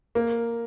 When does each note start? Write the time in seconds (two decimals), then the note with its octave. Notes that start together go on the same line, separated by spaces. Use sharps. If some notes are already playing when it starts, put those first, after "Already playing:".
0.15 A#3